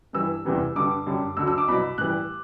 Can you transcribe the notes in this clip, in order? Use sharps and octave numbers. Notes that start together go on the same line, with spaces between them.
G2 E3 G3 E6
E2 C3 E3 G3
G2 D3 G3 D6
F#2 D3 G3
D2 D3 F#3 E6
E6
D6
C2 B2 F#3 B5
A2 E3 G3 F#6